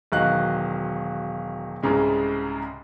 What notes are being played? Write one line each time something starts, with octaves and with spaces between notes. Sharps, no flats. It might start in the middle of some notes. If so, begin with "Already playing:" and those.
E1 D#3 F#3 D#5 F5 F#6
C2 G#2 C#3 G#3